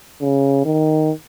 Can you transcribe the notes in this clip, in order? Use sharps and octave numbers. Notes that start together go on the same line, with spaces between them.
C#3
D#3